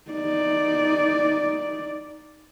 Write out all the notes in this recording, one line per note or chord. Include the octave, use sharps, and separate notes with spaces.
D#4 D5